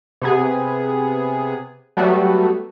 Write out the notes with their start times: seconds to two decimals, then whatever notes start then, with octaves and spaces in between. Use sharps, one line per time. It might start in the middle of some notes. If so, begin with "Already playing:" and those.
0.22 C3 B3 G#4
1.97 F#3 G3 A3 B3 F#4